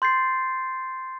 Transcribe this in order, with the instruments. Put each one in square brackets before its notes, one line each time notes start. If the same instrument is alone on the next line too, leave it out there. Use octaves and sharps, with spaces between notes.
[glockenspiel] C6 G6 A6 C7